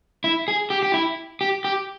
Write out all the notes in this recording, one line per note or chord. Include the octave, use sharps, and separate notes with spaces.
E4
G#4
G4
G4
E4
G4
G4